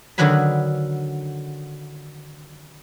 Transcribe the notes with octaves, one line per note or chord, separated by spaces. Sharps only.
D3 D#3 F#3 B4 G#5 B5